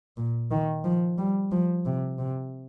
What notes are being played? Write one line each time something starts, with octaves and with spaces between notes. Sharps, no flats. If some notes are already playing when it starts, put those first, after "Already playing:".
A#2
D#3
F3
G3
F3
C3
C3